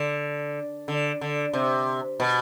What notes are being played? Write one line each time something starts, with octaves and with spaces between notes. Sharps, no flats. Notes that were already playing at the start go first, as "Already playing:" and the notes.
Already playing: D3
D3
D3
C3
B2